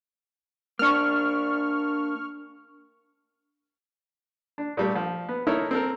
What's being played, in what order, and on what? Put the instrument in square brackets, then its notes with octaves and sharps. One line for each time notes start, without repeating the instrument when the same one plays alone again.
[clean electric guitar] A#3 D4 [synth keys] C#6 F6
[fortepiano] D4
A#2 G3 A3
F3
B3
D#4 E4 A4 A#4 C#5 E5
C4 A4 A#4